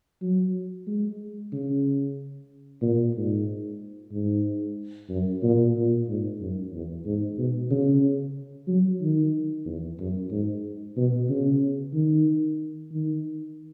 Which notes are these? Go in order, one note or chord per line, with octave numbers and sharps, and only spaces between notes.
F#3
G#3
C#3
A#2
G#2
G#2
F#2
A#2
A#2
G#2
F#2
E2
G#2
B2
C#3
F#3
D#3
E2
F#2
G#2
B2
C#3
D#3
D#3